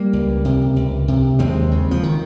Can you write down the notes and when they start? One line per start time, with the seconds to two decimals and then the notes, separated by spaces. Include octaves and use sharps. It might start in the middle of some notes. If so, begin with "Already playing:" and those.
Already playing: G3 A#3
0.13 C#2
0.45 C3
0.76 C#2
1.08 C3
1.39 D#2 G#3 C4
1.71 C#3
1.91 F3
2.03 D#3